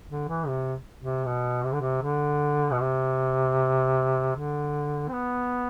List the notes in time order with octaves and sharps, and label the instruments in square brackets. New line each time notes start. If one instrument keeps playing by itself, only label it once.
[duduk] D3
E3
C3
C3
B2
C3
D3
C3
D3
B2
C3
D3
C4
B3